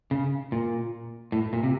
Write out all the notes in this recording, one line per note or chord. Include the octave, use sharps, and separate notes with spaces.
C#3
A#2
A2
A#2
C3